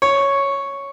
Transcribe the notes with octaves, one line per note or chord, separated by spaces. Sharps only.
C#5